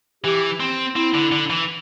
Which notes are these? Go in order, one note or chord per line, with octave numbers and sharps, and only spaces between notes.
E3 G4
C4
C4 E4
D3
D3
E3